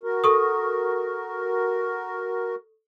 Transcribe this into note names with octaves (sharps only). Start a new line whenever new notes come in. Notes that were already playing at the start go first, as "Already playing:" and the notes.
F#4 A#4
A4 C#6 D#6